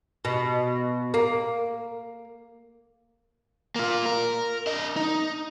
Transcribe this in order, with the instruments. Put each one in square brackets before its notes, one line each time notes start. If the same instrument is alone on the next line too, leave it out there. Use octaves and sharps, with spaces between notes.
[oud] B2
A#3
[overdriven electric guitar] A#3 F4
A#4
D4 D#5
D#4